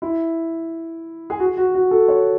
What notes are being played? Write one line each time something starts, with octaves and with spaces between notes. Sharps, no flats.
E4
G#4
F#4
F#4
F#4
A4
C#5